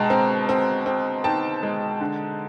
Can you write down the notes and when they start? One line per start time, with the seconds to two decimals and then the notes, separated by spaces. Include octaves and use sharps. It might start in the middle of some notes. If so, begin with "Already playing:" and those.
Already playing: B2 G#3 G5 A5 A#5
0.10 C4
0.49 C4
0.86 C4
1.24 D#4 G5 A5
1.63 G#3
2.01 D3